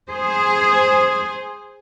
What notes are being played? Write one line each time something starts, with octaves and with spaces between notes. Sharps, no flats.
G#4 C5